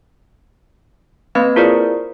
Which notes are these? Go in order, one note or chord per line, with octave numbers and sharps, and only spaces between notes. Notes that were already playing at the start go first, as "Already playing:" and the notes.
A#3 C4 B4 F5 B5 G#6
E4 F4 G#4 A#4 C5 D5